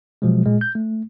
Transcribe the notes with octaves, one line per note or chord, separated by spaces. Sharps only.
B2 F3 F#3 G#3
A#2 G#3
G6
A3